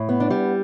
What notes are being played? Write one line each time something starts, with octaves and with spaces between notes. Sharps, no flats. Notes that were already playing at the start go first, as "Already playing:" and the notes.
Already playing: A2
B3
D4
G3